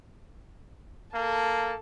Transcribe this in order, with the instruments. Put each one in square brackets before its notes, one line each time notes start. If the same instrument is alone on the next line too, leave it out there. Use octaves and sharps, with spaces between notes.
[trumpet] A#3 [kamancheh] A4 A5